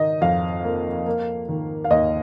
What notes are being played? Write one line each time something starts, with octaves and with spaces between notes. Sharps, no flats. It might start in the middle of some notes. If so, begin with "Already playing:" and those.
Already playing: D#3 D#4 D#5
F2 F5
A#3
A#3
D#3
F5
D#2 D#5